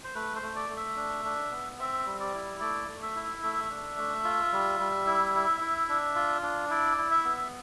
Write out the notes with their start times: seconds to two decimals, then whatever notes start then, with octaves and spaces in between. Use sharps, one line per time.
0.04 C5
0.15 A3 B4
0.36 C5
0.42 A3
0.56 D5
0.69 A3
0.77 E5
0.96 D4
1.25 D4
1.51 B3
1.78 C4 E5
2.06 G3
2.20 D5
2.34 E4
2.60 A3 D5
2.88 A3
3.02 E5
3.16 E4
3.42 A3 E5
3.70 D4
3.98 A3
4.24 F4
4.52 G3
4.80 G3
5.06 E4
5.34 E4
5.61 E4
5.89 D4
6.16 F4
6.43 D4
6.70 E4 D5
6.98 E4
7.11 E5
7.25 B3